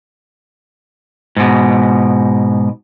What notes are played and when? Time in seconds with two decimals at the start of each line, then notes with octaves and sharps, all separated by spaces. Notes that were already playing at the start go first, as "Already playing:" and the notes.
1.37 G#2 B2